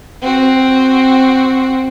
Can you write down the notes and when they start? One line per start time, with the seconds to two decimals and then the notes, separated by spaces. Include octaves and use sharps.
0.21 C4 F#4